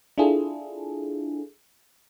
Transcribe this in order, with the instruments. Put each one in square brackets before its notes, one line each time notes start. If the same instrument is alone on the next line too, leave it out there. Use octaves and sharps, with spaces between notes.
[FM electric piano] D4 E4 F4 G#4 A4